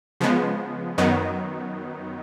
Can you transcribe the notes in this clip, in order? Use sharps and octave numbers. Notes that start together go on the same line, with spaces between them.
C#3 F3 G#3 B3
F#2 D#3 F#3 B3 D#4